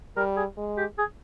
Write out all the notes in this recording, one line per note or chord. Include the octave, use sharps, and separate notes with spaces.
G3 A#4
G#4
G#3
G4
G#4